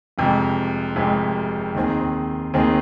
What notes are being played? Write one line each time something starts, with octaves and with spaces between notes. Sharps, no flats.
F1 F2 C3 G#3
F1 F2 C3 G#3
D#2 D#3 C4 G#4
D#2 D#3 C4 G#4